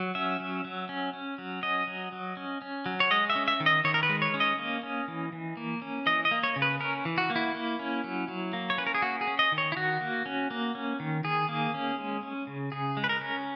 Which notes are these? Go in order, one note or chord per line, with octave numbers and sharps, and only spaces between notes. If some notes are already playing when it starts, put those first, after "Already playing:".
Already playing: F#3
C#4 E5
F#3
F#3
C#4
C#4
F#3
C#4 D#5
F#3
F#3
C#4
C#4
F#3
C#5
G#3 D#5
E5
C#4
E5
D#3
D#5
D#3 C#5
A#4
B4
G#3
C#5
C#4
D#5
A#3
C#4
E3
E3
A#3
C#4
E3 D#5
D#5
A#3
C#5
C#3
B4
C#4 A#4
E3
F#4
A#3
E4
A#3
C#4
F#3
F#3
A#3
C#5
C#4 B4
A#4
G#4
A#3 F#4
G#4
C#4
D#5
D#3
C#5
E4
D#3 F#4
A#3
C#4
A#3
C#4
D#3
D#3 G#4
A#3
C#4
G#3
C#4
C#3
C#3 G#4
G#3
B4
A#4
C#4